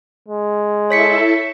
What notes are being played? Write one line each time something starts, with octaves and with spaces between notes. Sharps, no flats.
G#3
E4 A4 C#5 E5 B6 C#7